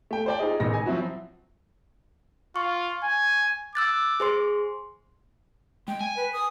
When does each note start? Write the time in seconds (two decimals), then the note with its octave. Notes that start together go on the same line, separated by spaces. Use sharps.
0.11 A3 G5
0.26 C5 D5 G5
0.39 D#4 F4 G#4 D#5
0.60 A1 D#3 G#3 A#6
0.73 G#5
0.86 F3 F#3 C4 E4 F#4
2.56 F4 C#6
3.03 G#5
3.75 D6 E6 F#6 A6
4.20 G#4 C5 C6
5.88 G#3 G5
6.01 G#5
6.17 B4
6.33 D#6